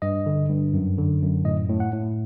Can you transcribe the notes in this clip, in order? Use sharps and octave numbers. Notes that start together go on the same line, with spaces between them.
G2 D#5
D3
G2
F#2
D3
F#2
A2 D#5
A2
F#5
A2